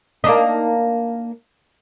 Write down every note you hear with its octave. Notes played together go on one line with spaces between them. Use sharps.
A#3 D4 D#4